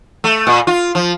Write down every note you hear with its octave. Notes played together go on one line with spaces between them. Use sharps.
A3
A#2
F4
F3